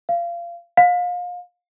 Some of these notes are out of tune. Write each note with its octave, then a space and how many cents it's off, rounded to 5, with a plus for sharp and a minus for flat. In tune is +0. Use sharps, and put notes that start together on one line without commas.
F5 -25
F5 +30